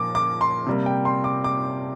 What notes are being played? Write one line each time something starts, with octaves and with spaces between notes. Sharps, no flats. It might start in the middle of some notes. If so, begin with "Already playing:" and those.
Already playing: A#2 F3 A#3 D6
D6
C6
C3 G3 A#3
G5
C6
D6
D6